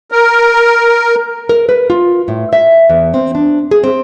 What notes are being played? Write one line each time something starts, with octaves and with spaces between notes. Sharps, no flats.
A#4
A#4
B4
F4
A2
E5
E2
C4
D4
G#4
C4